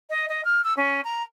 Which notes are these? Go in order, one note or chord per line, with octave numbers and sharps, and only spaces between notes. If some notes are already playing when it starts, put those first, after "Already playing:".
D#5
D#5
F6
E6
C#4
A#5